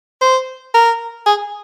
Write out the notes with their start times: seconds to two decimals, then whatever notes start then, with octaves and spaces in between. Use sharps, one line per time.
0.21 C5
0.74 A#4
1.26 G#4